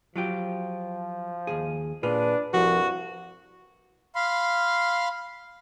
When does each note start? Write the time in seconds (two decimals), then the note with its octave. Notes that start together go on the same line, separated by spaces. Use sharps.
0.16 F3 F#3 F4 G4
1.47 D#2 G#2 G#4
2.03 A#2 D4 F4 G#4 B4
2.54 C2 G2 F3 F#4
4.15 F5 B5 C6